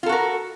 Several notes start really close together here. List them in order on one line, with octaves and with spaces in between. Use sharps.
F4 A4 F#4 A#4